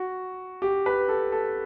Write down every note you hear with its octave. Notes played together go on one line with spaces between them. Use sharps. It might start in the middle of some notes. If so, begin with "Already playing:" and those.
Already playing: F#4
G4
B4
A4
A4